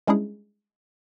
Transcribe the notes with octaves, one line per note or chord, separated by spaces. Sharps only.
G3 G#3 C#4 D4 E4 G#4